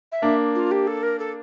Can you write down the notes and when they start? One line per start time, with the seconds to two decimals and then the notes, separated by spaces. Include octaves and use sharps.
0.12 E5
0.22 A#3 D4
0.55 F4
0.71 G4
0.87 A4
1.03 A#4
1.19 A4